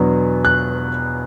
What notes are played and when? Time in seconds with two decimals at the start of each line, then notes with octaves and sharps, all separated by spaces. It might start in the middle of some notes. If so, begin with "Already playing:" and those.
Already playing: E2 B2 F#3 B3 D4
0.45 F#6